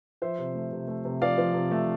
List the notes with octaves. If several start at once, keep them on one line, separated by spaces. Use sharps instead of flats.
F3 C5 E5
C3
A3
C3
A3
C3
F3 D5 F5
F3
C3
A3